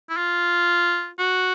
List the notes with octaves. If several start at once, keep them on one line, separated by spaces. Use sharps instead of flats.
E4
F4
F#4